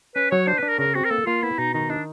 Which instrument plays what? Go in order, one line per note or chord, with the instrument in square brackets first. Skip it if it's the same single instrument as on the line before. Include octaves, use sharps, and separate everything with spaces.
[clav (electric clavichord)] C#4 [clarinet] B4
[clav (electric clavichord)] F#3 [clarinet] C#5
[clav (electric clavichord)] D4 [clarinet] C5
[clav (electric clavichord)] D4 [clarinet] B4
[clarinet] A#4
[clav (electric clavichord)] C#3 [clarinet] A#4
[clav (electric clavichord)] C4 [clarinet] F#4
[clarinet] A#4
[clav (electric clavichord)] A#3 [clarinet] A4
[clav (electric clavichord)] A#3 [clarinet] F4
[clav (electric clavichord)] B3 [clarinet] E4
[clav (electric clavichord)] B2 [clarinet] D#4
[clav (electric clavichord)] D#3 [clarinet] D#4
[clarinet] D4 [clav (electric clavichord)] D#4